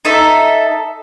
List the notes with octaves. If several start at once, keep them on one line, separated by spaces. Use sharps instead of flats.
D#4 A4 E5